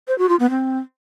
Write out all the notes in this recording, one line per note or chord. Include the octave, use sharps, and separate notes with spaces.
C5
F#4
F4
B3
C4